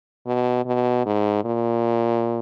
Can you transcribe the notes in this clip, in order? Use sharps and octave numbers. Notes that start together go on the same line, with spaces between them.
B2
B2
G#2
A#2